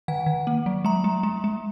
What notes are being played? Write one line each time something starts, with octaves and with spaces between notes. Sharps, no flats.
D#3 F#5
D#3
A#3
F#3
G#3 A#5
G#3
G#3
G#3